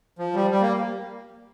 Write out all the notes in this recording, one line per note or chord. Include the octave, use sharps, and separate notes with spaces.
F3
G3
G3
A#3